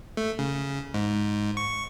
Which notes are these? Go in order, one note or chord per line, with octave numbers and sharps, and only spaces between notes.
A3
C#3
G#2
C#6